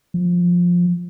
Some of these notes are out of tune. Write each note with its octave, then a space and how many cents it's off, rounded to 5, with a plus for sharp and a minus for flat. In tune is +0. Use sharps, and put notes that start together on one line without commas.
F3 +10